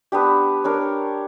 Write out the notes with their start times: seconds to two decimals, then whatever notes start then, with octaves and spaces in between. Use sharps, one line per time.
0.12 B3 D4 G4
0.64 D4 A#4 C#5